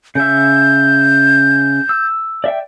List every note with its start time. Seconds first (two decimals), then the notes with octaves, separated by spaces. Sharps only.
0.15 C#3 E5 G6
1.89 E6
2.44 D5 E5 G5